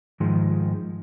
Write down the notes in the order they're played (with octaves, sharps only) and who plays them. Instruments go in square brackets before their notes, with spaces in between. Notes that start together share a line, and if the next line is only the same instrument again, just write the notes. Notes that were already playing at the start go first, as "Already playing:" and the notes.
[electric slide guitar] G#2 D#3 F3 G#3